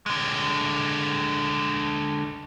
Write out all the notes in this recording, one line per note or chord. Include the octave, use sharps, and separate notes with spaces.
D3 G#3